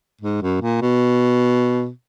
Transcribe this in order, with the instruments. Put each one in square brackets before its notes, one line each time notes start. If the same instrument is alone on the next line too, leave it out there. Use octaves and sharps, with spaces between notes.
[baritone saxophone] G#2
F#2
A#2
B2